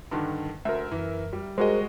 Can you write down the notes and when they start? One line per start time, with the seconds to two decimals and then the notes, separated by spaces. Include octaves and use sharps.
0.11 G2 D3 D#3
0.65 D2 A#4 E5
0.91 F#2 E3
1.33 G3
1.58 G#3 F#4 G#4 A#4 C5 D#5